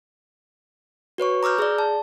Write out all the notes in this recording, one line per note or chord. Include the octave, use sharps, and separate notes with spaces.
F#4 B4 C#5 C#6
A#5 D6 E6 F6 G6
G#4 D5
A5